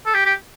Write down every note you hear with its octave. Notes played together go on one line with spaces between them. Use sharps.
A4
G4
G4